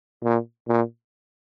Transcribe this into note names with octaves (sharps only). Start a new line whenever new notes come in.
A#2
A#2